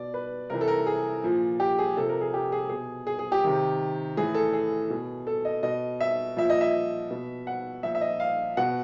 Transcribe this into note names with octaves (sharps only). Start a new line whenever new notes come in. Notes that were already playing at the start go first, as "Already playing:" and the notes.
Already playing: B2 D5
B4
C3 E3 A#4
A4
A#4
G#4
A#2 F3
G4
G#4
C3 F3 A4
A#4
G#4
G4
G#4
B2 G#4
G#4
G#4
G4
C3 D#3
A2 E3 G#4
A4
G#4
B2
A4
D#5
B2 D#5
E5
A#2 F3 E5
D#5
E5
B2
F#5
A#2 F3 E5
E5
D#5
F5
B2 F#5